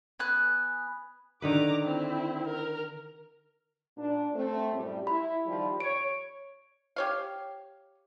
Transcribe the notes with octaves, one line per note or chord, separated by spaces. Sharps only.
B3 G#5 F#6
D3 D#3 B4 A#5 D6
C4 E4
A#4
A#2 D4
A3 C4
F#2 A2 G3
E4 B5
D#3 F3 G3
C#5 D7
G4 C#5 F5